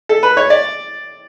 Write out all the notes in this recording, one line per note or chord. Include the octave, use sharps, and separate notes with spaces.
A4
B4
C#5
D5